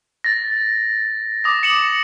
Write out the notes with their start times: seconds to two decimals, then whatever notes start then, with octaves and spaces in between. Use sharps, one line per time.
0.24 A6 A#6
1.44 D6 D#6 A#6
1.63 C#7 E7 F#7